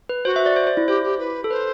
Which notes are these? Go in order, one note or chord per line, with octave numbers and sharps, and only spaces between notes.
B4
F#4 C5
E5
D5
C5
C5
E4
G4 C5
G4
B4
A4
B4 C5